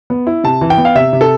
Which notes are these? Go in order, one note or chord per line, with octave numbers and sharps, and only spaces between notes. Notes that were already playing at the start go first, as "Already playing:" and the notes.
B3
E4
C3 A5
E3
G5
B3
F5
C3 E5
C3
A4